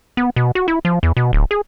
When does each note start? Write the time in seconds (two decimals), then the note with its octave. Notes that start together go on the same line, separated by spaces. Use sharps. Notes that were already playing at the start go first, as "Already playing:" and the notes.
0.17 B3
0.36 B2
0.55 F#4
0.68 E4
0.85 F3
1.03 E2
1.17 B2
1.33 D1
1.51 G#4